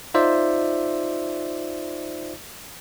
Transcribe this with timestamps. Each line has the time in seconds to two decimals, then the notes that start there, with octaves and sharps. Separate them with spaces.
0.14 D#4 F4 C5 D5 E5